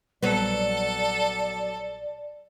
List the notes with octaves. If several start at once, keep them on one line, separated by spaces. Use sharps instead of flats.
A#1 F#3 G3 B3 A4 D5